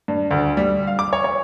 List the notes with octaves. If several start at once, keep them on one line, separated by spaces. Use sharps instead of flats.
G2
D2
G3
F5
D6
C#5
C#5